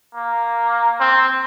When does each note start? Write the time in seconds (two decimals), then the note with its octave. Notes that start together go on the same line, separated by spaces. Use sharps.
0.15 A#3
1.00 C4